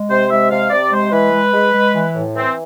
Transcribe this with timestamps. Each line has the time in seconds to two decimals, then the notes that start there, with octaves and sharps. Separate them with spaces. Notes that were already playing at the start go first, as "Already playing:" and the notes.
Already playing: G#3
0.09 C3 C5
0.30 G#3 E5
0.50 C3 F5
0.70 C3 D5
0.91 G#3 C5
1.12 E3 B4
1.32 G#3
1.53 G#3
1.74 G#3
1.93 E3
2.14 A2
2.35 E3 C4